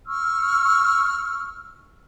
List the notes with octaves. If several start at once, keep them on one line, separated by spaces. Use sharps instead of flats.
C#6 E6 F6